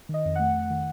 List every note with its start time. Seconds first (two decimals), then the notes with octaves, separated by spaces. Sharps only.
0.09 D#3 D#5
0.25 F2
0.35 A3 F#5
0.55 F2
0.70 D#3